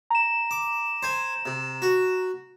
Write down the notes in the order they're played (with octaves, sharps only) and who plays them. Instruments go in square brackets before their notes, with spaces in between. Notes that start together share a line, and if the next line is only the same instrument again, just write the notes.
[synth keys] A#5 E7
[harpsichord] D6
C5 G#5
C3
F#4